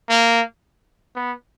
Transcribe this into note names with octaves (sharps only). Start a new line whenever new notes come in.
A#3
B3